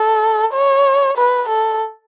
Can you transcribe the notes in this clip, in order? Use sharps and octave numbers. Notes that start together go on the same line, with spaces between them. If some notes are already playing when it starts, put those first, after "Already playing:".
Already playing: A4
C#5
B4
A4